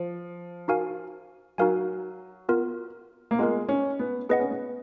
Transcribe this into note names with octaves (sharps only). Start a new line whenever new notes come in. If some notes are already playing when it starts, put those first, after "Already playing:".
Already playing: F3
D#4 F#4 A#4 F5 G#5
F#3 D#4 F#4 A#4 F5 G#5
B3 F4 A#4
A#3
G#3 B3 F4 A#4
C#4
B3
B3 G#4 B4 D#5 F#5
C#4
B3